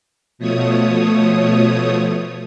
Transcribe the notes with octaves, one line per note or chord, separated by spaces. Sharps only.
B2 F3 A3 C#5 D#6